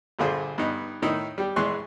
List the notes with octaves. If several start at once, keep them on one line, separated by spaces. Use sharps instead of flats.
A#1 G2 D3 F4 G#4 C5
G2 B3 D#4
A2 D#3 D#4 E4
G3 G4
A#1 E3 G#3 C6 C#6 F#6